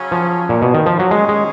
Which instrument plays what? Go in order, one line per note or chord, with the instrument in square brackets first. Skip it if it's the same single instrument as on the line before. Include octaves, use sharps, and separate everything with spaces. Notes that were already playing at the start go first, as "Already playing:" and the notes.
Already playing: [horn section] C#3 F#3 C#4
[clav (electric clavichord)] F3
A#2
B2
D#3
F3
F#3
[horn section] G#2 D#3 A#3 C#4 G#4 [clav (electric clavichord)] G#3
[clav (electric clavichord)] G#3